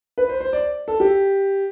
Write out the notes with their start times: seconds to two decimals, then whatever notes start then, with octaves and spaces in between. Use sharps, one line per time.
0.18 B4
0.29 C5
0.41 C5
0.53 D5
0.88 A4
1.00 G4